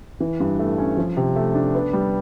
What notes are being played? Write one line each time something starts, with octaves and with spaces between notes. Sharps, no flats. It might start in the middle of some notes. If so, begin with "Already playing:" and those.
E3
G2
A3
C#4
F3
C3
A3
D4
B3
G3